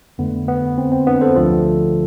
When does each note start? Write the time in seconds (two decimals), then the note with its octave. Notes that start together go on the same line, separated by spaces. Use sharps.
0.18 F2 D3 A3 B3
0.48 B3
0.78 C4
0.92 C4
1.07 B3 D4
1.21 A4 C5
1.36 D2 D3 F3 A3 F4 A4